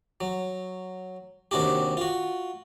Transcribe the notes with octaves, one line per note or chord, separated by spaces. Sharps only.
F#3
D#2 C3 D4 F#4 G4
F4 F#4